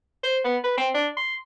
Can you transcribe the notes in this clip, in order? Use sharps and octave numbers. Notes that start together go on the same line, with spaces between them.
C5
B3
B4
C4
D4
C6